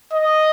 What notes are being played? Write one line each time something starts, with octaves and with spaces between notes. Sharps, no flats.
D#5